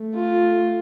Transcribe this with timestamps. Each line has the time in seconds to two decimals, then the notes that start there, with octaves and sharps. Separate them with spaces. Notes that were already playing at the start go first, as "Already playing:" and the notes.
Already playing: A3
0.14 F4